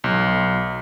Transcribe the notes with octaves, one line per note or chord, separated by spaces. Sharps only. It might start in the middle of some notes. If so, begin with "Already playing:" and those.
B1